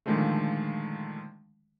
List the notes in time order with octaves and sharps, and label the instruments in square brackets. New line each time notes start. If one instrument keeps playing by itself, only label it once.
[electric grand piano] A#2 D3 D#3 F3 G#3 A3